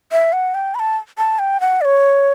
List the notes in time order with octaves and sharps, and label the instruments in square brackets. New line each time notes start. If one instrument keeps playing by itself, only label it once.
[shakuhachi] E5
F#5
G5
B5
A5
A5
G5
F#5
D5
C#5